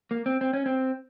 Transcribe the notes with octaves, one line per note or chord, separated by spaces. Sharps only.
A#3
C4
C4
C#4
C4